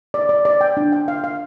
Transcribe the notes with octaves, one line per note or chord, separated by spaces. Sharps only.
D5
D5
D5
G5
D4
G5
F5
F5